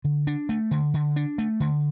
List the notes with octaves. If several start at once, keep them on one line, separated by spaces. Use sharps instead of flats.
D3
D4
A3
D3
D3
D4
A3
D3